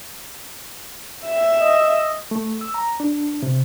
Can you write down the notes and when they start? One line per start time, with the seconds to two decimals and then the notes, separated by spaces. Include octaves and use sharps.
1.26 E5
1.61 D#5
2.31 A3
2.61 E6
2.74 A#5
3.00 D4
3.42 C3